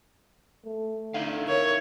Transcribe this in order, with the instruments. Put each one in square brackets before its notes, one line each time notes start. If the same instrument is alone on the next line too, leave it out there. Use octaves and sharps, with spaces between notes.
[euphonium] A3
[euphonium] D3 [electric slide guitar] D#4 E4 F5
[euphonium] A#4 [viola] C#5